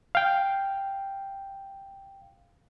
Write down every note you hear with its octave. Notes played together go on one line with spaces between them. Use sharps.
F5 G5